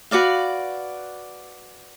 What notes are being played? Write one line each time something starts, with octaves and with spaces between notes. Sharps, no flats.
F#4 B4 D5 F5